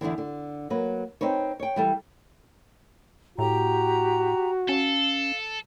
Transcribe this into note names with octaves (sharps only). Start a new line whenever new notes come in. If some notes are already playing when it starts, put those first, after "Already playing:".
E2 B2 D3 E3
D3
F#3 A#3 B4
C4 D#4 B4 C#5
C#5 G5
E3 G3 A4
A2 F#4 G4 G5 A#5
C#4 A4 F5